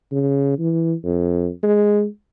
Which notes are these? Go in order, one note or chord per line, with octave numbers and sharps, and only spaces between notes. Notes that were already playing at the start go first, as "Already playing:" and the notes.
C#3
E3
F2
G#3